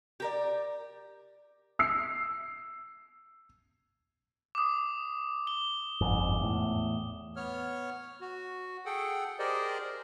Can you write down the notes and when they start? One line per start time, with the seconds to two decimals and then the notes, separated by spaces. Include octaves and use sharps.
0.20 G4 A#4 D5
1.79 E6 C7
4.55 D6 D#6
5.47 G7
6.01 G1 F2 G#2
6.39 E2 A2
7.36 B3 C#5 F6
8.21 F#4
8.86 G#4 A4 F#5 G5
9.39 G4 G#4 A#4 C5 D5 D#5